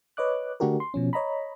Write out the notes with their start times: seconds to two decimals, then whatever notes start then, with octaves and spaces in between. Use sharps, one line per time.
0.17 B4 C#5 D#5 D6 F#6
0.60 D3 A3 D4 F#4 G4 A#4
0.80 C6
0.94 B2 F3 C#4
1.13 C#5 D#5 A#5 B5